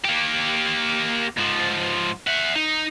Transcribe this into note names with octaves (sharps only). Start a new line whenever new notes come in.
A#3 G4
G#2 F3
E5 F#5
D#4